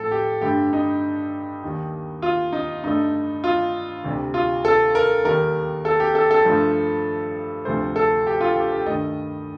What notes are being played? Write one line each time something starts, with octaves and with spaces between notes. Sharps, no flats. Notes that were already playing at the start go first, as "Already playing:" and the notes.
Already playing: A2 F3 A4
G4
G2 D3 A3 G4
D#4
D#2 D#3 G3
F4
D#4
G2 D3 A3 D#4
F4
D2 C3 G3
F4
A4
A#4
D#2 D#3 G3 A#4
A4
G4
A4
A4
G2 F3 A3
D2 C3 F3 A3 C5
A4
G4
F4
G4
G4
G2 D#3 A3 D#5